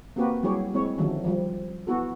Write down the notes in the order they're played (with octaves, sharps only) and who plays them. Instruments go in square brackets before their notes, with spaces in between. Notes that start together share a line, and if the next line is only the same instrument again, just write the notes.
[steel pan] A#3 C4 F#4 G4 B4
F#3 G3 E4 G4 G#4 C#5
G#3 C4 E4 C#5
D3 D#3 F3 F#3 A3 C#4
F3 G3
B3 E4 F#4 A4